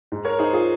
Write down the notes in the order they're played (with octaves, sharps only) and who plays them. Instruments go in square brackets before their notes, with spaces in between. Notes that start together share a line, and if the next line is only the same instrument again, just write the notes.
[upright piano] G#2
[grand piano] A#4 C#5
[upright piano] D#4 [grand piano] G#4 C5
[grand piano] F4 G#4